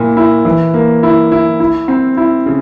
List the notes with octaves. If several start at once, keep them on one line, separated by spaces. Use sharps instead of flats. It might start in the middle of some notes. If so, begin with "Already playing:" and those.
Already playing: A#2 E4
E4
E3
A#3
E4
E4
E4
C4
E4
C#3